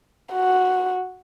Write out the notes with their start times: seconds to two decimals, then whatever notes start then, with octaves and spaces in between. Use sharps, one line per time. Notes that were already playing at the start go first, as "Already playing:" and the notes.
0.33 F#4